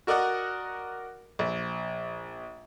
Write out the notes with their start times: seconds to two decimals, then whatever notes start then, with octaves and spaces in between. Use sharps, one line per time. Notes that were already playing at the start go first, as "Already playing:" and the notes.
0.07 F#4 A#4 D5 D#5 F#5 D#6
1.39 A#1